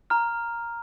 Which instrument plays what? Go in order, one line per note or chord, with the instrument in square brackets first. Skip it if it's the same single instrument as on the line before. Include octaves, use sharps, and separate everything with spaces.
[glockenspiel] A#5 F6